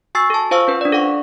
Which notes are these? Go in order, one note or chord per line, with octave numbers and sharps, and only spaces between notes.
F#4 G#5 C#6 E6 A6 C7
A4 A5
F4 C5 F5 C#6 E6
C#4 B4 C5
D4 D5
A4 F5 F#5 C#6